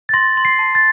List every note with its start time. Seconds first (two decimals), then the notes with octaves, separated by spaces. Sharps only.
0.09 A6
0.14 C6 A#6
0.37 C6
0.45 C7
0.59 A5
0.75 A6